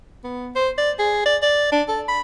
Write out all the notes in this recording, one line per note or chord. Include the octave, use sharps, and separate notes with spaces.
B3
C5
D5
G#4
D5
D5
D4
A4
B5